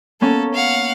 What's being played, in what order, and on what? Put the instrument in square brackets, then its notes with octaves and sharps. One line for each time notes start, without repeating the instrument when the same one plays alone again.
[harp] A#3 B3 C#4 [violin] A4
[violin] F5 F#5